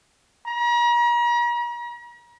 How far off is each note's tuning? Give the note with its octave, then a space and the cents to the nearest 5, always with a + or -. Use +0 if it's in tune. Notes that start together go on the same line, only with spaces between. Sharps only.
A#5 +40